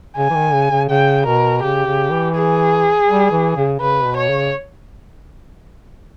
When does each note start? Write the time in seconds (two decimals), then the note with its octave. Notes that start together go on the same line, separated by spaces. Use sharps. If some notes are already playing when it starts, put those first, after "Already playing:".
0.17 C#3 G#5
0.30 E3
0.35 D#3
0.53 C#3
0.71 C#3
0.89 C#3 G5
1.26 B2 A#4
1.62 C#3 G4
1.86 C#3
2.11 E3
2.35 G#4
3.08 G3
3.31 E3
3.56 C#3
3.80 C#3 B4
4.05 B2
4.17 C#5
4.29 C#3